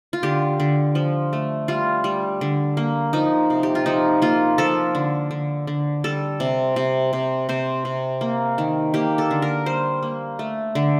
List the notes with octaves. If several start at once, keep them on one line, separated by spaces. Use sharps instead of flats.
F4
D3 G4
D3
F3
A3
G3 F4
G3
D3
A#3
F3 D#4
C3
G4
F4
F3 D#4
A#3 F4
F3 A4
D3
D3
D3
G3 A4
C3
C3
C3
C3 C5
C3
A#3
D#3
A#3 G4
A4
D3
A#4
G3 C5
A#3
A3
D3